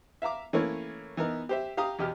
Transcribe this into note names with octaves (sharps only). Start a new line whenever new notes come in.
E5 F5 A#5 D6
E3 A3 A#3 C#4 E4 C#5
E3 B3 D#4 A#4
G4 C5 E5
G4 F5 A#5 D#6
E2 B2 G4 F6